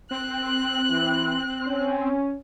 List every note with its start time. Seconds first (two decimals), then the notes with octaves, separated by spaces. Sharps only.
0.11 C4 F#6
0.89 E3
1.67 C#4